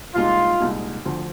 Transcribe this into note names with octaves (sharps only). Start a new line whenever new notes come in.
C2 A#2 G#3 D#4 F4
C2 A#2 G#3 D#4
D2 D3 F3